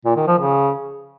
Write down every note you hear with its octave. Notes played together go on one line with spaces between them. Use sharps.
A#2
D#3
F3
C#3